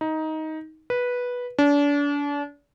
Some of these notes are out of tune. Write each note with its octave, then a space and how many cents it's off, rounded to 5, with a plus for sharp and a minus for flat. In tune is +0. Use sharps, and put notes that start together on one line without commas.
D#4 +15
B4 -10
D4 -35